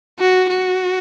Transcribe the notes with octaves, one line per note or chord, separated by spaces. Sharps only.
F#4
F#4